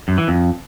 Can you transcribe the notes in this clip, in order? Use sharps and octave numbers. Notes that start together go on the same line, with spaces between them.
F#2
E3
F2